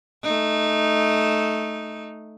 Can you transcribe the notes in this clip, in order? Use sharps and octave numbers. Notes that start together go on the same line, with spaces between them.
A3 D#4